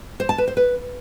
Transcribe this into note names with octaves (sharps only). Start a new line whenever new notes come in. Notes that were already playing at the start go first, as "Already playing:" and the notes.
C5
A5
B4
C5
B4